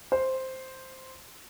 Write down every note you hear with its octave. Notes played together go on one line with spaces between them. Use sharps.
C5